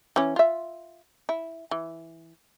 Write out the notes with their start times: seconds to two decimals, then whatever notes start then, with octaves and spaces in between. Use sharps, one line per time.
0.16 E3 C#4
0.36 F4 E5
1.29 E4
1.71 E3